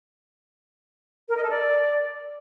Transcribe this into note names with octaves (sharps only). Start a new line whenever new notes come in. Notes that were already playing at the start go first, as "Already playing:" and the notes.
A#4
D#5
A4
D5